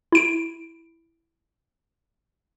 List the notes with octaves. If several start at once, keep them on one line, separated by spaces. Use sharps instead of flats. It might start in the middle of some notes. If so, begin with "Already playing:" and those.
E4 D7